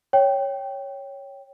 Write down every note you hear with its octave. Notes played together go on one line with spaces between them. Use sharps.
C#5 G5